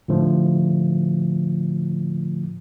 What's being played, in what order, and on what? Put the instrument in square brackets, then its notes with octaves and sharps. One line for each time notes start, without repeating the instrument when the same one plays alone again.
[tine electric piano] A2 D3 F3 A3